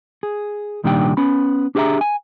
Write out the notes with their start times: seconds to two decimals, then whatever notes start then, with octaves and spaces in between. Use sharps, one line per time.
0.23 G#4
0.84 C2 A#2 D#3 G3 D4 G5
1.17 B3 C#4 B5
1.75 D4 G4 G#4 C5 E5 A#5
2.01 G#5